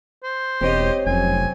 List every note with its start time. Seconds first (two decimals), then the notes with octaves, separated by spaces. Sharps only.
0.23 C5
0.61 E1 C4 G4 C#5 D#5
1.06 F1 F#2 G#5